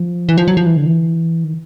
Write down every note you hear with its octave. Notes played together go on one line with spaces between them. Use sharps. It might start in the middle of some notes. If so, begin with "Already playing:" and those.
Already playing: F3
E3
F3
F#3
F3
E3
D3
E3
D#3